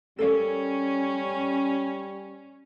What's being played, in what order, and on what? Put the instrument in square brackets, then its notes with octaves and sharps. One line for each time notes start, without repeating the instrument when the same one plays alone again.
[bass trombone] G3 [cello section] C#4 [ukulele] A4 A#4 D5